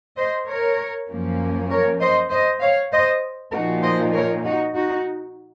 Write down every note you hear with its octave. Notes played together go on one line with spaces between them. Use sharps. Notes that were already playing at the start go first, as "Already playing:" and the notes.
C5 D#5
A#4 C#5
F#2 F3 A#3 C#4
A#4 C#5
C5 D#5
C5 D#5
C#5 F5
C5 D#5
A#2 F3 A#3 D#4 F#4 A#4
C5 D#5
A#4 C#5
D#4 F#4
D#4 F#4